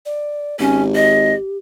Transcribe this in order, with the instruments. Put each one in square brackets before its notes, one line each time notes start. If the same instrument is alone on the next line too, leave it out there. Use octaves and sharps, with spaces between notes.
[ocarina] D5
[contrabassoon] G#1 [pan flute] C#4 [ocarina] G4
[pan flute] D#5